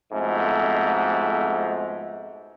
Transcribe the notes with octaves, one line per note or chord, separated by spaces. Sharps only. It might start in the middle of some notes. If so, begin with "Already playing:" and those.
F2 G#2 B2 A3